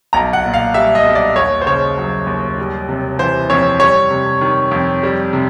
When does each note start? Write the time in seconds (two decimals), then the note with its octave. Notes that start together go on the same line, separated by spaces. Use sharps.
0.13 B1 A#5
0.33 F#5
0.44 A#2
0.54 F5
0.74 G3 E5
0.95 D#5
1.05 B1
1.15 D5
1.36 D#2 C#5
1.61 C5
1.66 C#3 C#5
1.97 F#3
2.27 D#2
2.58 G3
2.89 C3
3.19 E3 C5
3.50 F2 C#5
3.80 G3 C#5
4.11 C3
4.41 D#3
4.71 F2
5.03 G3
5.33 C3